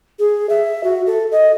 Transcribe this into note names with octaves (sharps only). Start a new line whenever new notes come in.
G#4
E5
F#4
A4
D#5